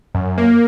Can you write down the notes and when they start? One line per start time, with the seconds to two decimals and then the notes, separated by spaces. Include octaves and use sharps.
0.15 F#2
0.38 A#3